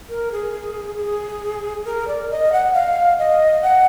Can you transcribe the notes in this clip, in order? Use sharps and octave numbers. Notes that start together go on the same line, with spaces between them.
A#4
G#4
G#4
A#4
D5
D#5
F#5
F5
D#5
F#5